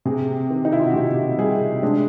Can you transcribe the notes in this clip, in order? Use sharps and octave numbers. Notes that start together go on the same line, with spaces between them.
C3 G#4
D#3
D#4
E4
F4
F#4
C3 G4
G3 G#4
G#3 D4